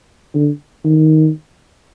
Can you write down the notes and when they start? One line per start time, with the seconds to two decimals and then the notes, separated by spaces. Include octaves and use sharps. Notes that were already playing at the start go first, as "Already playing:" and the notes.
0.34 D3
0.84 D#3